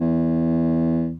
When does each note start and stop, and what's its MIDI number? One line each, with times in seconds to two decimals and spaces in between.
0.01 1.15 40